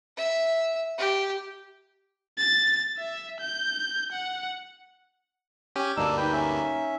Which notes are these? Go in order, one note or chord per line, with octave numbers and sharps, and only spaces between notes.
E5
G4
A6
E5
G6
F#5
C#4 G4 G#5
D2 G2 A#3 D4 D#4 E6
D#4 B4 G5
C#4 E5